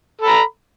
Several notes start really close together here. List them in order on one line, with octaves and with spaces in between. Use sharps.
A4 B5 A#5